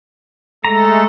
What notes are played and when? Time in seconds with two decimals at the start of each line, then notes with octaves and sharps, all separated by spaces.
0.65 G#3 A3 A4 A#5